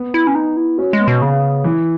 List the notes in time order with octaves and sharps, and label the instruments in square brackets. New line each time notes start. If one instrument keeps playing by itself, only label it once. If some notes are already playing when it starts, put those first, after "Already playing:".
Already playing: [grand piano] B3
[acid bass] E4
C#4
D#4
E4
[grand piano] C#4 [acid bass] F#4
[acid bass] G#3
[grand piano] B3
[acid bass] B2
[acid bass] C#3 [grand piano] B3
[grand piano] E3